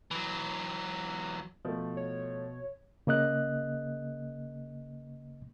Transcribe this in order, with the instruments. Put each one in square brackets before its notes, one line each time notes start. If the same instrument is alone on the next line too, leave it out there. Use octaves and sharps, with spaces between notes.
[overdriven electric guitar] E3 F#3
[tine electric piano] B2 [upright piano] F3 A3
[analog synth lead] C#5
[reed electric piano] C#3 A#3 D#5 F#6